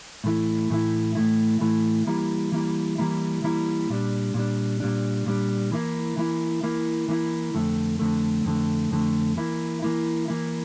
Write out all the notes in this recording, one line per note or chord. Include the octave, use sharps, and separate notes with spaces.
A2 E3 A3 E4
A2 E3 A3 E4
A2 E3 A3 E4
A2 E3 A3 E4
E3 G3 A#3 E4
E3 G3 A#3 E4
E3 G3 A#3 E4
E3 G3 A#3 E4
A#2 G3 D4
A#2 G3 D4
A#2 G3 D4
A#2 G3 D4
E3 A#3 E4
E3 A#3 E4
E3 A#3 E4
E3 A#3 E4
F2 D3 A3
F2 D3 A3
F2 D3 A3
F2 D3 A3
E3 A#3 E4
E3 A#3 E4
E3 A#3 E4